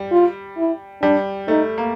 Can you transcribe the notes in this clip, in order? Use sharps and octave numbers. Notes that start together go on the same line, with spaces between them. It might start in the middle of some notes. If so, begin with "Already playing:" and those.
Already playing: G3
F4
E4
G3 D4
A3 D#4
A#3